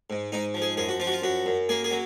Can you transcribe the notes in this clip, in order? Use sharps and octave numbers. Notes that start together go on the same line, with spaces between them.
G#2
G#2 D#4
F3
G#4
F#2 G#4
F#4
F3 F4
F#4
F4
F#2 F#4
F#2
A#3 G#4
G#4
F#3